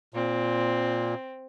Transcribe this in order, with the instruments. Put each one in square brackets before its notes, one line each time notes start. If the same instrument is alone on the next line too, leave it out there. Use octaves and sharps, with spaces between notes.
[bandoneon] A#2 [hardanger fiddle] C4